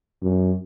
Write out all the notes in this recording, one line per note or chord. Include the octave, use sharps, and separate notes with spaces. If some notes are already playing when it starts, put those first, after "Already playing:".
F#2